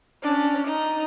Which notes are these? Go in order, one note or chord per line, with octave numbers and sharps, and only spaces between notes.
C#4 D4
D#4